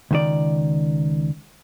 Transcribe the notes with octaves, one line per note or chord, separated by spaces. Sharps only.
C#2 D#3 D5